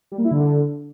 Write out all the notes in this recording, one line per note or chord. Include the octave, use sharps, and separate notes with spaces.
G3
A#3
E4
D3